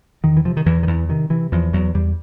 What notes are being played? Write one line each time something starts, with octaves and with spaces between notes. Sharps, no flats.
E2 D#3
E3
C3 F3
D#3
E2 E3
D#3
E2 E3
C3 D#3
C3 E3
E2 F3
E2 F#3
E2 G3